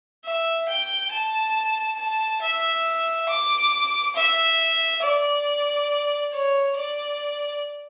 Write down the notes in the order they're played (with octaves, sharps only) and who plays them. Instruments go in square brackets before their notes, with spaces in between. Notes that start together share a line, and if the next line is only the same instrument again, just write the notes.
[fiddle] E5
G5
A5
A5
E5
D6
E5
D5
C#5
D5